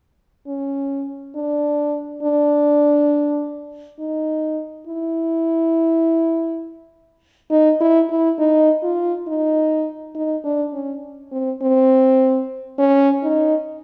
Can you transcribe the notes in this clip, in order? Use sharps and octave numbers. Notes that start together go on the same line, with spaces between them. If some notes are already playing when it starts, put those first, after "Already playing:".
C#4
D4
D4
D#4
E4
D#4
E4
E4
D#4
F4
D#4
D#4
D4
C#4
C4
C4
C#4
D#4